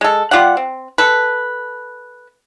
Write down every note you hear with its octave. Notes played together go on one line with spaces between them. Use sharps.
G#3 A4
G3 F4 G4 F#5
C4
A4 B4